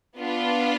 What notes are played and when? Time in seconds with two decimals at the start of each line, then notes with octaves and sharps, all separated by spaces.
0.18 B3 D4 F4